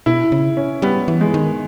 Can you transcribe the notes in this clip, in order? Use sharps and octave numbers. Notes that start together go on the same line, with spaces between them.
B2 E4
C#3
C#4
G3 B3
E3
G#3
D#3